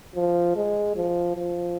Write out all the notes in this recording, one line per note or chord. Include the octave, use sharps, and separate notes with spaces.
F3
G#3
F3
F3